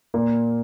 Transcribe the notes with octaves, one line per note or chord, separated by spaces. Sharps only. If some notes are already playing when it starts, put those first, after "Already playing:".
A#2 A#3